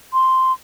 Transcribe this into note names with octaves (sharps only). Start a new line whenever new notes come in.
C6